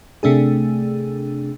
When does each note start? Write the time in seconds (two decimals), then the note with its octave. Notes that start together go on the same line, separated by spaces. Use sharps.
0.23 C3 A3 D4 G#4